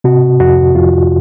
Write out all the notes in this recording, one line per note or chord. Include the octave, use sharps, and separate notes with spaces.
C3 F#4
F2 F#4
F2 F4